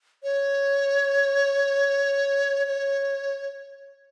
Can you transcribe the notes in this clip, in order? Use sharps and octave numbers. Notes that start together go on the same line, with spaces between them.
C#5
C#5